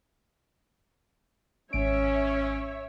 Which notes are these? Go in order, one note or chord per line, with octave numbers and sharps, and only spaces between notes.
G#1 C#4 C#5 E5 D7